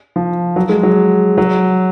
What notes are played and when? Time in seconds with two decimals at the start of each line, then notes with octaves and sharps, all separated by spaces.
0.16 F3
0.56 F#3
0.69 G#3
0.83 F#3
1.38 F#3